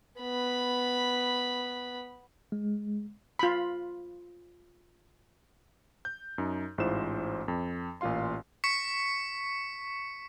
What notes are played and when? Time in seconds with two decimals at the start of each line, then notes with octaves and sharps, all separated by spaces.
0.21 B3 B5
2.52 G#3
3.39 F4 B5
6.05 G6
6.38 F#2 D#4
6.78 A1 G#2 E4 F4 C5 E7
7.48 F2
8.01 A1 A#2 F4 F5 C6
8.64 C#6 B6 C#7